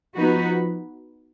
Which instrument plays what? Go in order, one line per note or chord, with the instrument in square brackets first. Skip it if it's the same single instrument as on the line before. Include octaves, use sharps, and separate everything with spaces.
[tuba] F3 [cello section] B3 D#4 F#4 B4